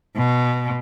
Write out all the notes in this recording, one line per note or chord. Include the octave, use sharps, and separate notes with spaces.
B2